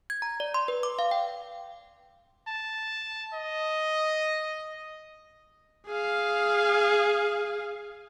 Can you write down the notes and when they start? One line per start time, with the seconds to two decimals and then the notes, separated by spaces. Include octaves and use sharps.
0.10 G#6
0.22 A#5
0.40 D5
0.54 C6
0.68 B4
0.83 D6
0.99 F5
1.11 G5
2.48 A5
3.34 D#5
5.87 G#4 F5